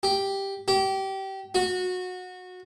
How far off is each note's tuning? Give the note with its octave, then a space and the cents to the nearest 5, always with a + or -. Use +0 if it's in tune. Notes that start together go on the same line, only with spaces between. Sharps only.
G4 +0
G4 -25
F#4 -20